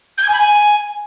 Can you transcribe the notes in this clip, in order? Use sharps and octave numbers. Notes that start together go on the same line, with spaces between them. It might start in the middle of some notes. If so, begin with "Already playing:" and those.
G6
G#6
G#5
B5
G#5